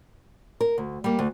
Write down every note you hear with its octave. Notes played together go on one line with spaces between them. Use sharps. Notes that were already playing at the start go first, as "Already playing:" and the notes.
A#4
D2
G3 A#3
D2